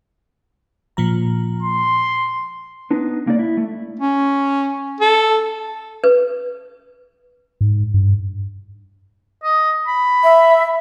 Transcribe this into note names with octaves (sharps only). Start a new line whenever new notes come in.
A#2 F3 A#5
C6
B3 D4 D#4
C2 A#3 D#4 D5
E4
A3
C#4
A4
B4
G#2
G2
D#5
B5
E5